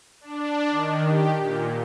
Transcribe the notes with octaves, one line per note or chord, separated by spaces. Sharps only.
D4
D#3
G4
A#2